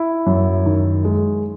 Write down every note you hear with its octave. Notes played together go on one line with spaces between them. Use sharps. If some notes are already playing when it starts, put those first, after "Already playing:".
Already playing: E4
F#2
D#3
G#3